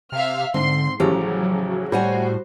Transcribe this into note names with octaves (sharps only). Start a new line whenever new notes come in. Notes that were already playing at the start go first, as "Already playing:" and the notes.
C3 E5 F5 F6
G#2 D3 C4 C6
A1 C#3 F3 F#3 G4 A#5
A2 G3 F#4 C5 C#5 F#5 G#5